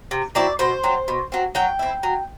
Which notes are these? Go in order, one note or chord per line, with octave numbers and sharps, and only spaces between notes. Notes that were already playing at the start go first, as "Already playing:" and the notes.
C3
F#3 C4 E4 D5
B2 C5
F#3 C4
B2
F#3 C4
F#3 G5
C4 E4
F#3